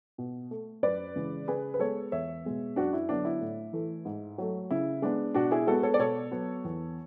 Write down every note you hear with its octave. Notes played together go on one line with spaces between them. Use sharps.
B2
A3
F#2 B4 D5
C#3 E3 G#3
C#3 G#4 B4
B4
G#3 B3 A4 C#5
E2 C#5 E5
B2 G#3 B3
F#2 D4 F#4
E4
D3 F#3 B3 D4
E4
A2
E3 A3
G#2
F#3 A3
C#3 E4
G#3 B3 D4
B2 D4 F#4
E4 G#4
G#3 B3 F#4 A4
A4 C#5
D5
B2 A4 C#5
F#3 B3
E2